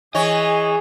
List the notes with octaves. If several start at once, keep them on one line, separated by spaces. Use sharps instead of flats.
E3 G#4 C#5 D#5